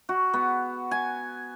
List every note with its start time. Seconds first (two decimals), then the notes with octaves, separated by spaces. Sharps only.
0.09 F#4
0.34 B3
0.91 G#5